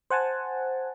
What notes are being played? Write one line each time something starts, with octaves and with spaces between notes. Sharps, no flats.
C5 F#5 G#5 A5